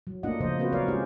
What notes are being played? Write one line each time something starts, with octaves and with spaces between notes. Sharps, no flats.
F#3
A3 A#3 D4 F4 D#5 F#5
A#2 C#3 F3 A#3 C5 D#5
A#3 C4 F4 F#4 B4 C5
F#3 A#4 B4 C#5 D5 F5
G#3 C#4 F4 G4 C5